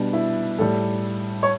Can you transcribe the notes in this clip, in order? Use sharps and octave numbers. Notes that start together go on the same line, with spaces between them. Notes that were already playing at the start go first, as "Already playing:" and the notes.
Already playing: B2 G3 D4
E4
A2 G3 A4
C#5